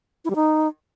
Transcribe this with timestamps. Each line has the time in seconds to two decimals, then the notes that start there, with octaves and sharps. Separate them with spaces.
0.25 E4
0.30 G3
0.35 D#4